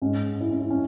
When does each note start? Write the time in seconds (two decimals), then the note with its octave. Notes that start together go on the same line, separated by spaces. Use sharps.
0.02 G#2 G#3 C#4
0.41 E4
0.51 C#4
0.61 E4
0.70 C#4